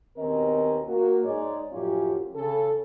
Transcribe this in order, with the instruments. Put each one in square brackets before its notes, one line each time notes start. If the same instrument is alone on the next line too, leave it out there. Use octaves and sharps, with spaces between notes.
[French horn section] D#2 B2 C4 C#4 A#4 D#5
A#3 F#4
G#2 G#3 D#4 G#4 C#5 D5
F#2 A2 F3 C#4 F4 G4
C#3 A4